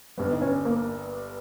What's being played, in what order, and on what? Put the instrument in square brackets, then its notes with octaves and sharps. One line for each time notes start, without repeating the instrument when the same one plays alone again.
[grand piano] G1 G2 G3 [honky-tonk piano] B3
[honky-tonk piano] D#4
C#4
A#3